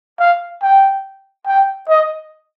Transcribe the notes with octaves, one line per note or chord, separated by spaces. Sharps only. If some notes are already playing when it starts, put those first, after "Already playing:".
F5
G5
G5
D#5